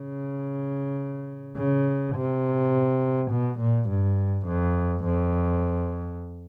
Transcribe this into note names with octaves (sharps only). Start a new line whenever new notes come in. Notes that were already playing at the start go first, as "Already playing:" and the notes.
Already playing: C#3
C#3
C3
B2
A#2
G2
F2
F2